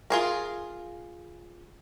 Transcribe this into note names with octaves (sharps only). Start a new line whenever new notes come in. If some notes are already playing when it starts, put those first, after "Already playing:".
F4 G#4 A#4